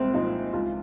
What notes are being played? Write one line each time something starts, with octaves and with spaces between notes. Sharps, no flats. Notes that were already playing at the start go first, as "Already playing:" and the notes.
Already playing: C2 A#2 G#3 C4
A#2 F3 D#4
C#2 F4